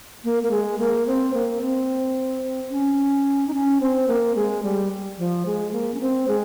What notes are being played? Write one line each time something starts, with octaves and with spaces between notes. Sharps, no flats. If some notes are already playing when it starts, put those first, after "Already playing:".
A#3
A#3
G#3
A#3
C4
A#3
C4
C#4
D#4
C#4
C4
A#3
G#3
G3
F3
G#3
A#3
C#4
C4
G#3